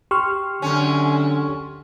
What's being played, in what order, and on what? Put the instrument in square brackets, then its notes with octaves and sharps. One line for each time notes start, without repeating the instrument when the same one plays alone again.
[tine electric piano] G4 [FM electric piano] C6 C#6 F6
[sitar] F#2 C#4 [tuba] D3